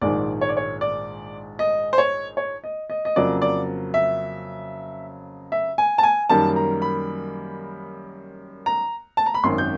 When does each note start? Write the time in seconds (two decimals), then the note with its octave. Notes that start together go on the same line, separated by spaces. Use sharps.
0.01 A#1 G#2 D#3 G#3 D5
0.41 C#5
0.49 D5
0.57 C#5
0.81 D5
1.59 D#5
1.93 C5
1.98 C#5
2.37 C#5
2.64 D#5
2.90 D#5
3.05 D#5
3.16 F2 C#3 F#3 A#3 D5
3.42 D5
3.94 E5
5.52 E5
5.78 G#5
5.98 A5
6.03 G#5
6.29 F#2 D#3 G3 A#3 A5
6.56 A#5
6.82 B5
8.66 A#5
9.17 A5
9.26 A#5
9.34 B5
9.43 G#1 F#2 D#3 C6
9.58 G6